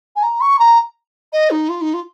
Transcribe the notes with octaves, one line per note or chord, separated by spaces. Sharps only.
G#5
A#5
C#6
A#5
D#5
D#4
F4
D#4
F4